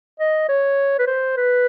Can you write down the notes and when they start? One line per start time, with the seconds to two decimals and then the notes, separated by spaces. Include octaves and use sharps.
0.20 D#5
0.49 C#5
0.99 B4
1.07 C5
1.37 B4